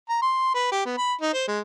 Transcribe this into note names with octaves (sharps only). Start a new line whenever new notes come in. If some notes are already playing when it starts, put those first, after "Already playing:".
A#5
C6
B4
G4
B3
B5
D#4
C5
G#3